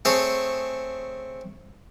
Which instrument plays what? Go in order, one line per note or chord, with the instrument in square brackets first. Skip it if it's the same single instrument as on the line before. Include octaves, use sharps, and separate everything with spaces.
[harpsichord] A3 C4 G#4 C#5